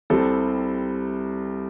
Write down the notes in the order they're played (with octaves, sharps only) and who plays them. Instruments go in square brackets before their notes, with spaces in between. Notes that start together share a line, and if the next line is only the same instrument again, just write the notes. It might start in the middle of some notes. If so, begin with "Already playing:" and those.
[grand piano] C2 C3 G3 C4 A4